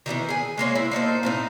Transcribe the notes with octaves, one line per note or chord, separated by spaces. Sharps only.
D#3 E3 G3 B3
G#4 G#5
G#3 A#3 C5 C#5
E4
A#3 D#4 A4 C5
A2 C4 D#4